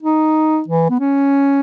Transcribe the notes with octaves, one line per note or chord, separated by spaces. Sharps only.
D#4
E3
B3
C#4